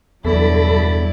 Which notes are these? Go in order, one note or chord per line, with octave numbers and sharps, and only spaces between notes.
E2 G2 B2 F#3 E4 A4 D5 B5